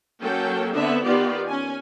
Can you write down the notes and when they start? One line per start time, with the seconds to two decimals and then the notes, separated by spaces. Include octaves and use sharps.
0.22 F#3 A#3 C#4 A4 G5
0.73 D3 B3 C4 D4 E5
1.04 D#3 B3 F4 G4 D5
1.46 C#4 G#5